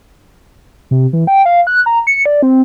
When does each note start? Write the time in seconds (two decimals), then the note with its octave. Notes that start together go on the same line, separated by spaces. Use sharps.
0.91 C3
1.13 E3
1.27 G5
1.45 F5
1.67 F#6
1.86 A#5
2.07 C#7
2.26 D5
2.42 C4